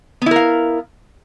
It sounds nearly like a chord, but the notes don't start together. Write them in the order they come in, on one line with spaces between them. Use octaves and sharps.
B3 E4 A#4 F5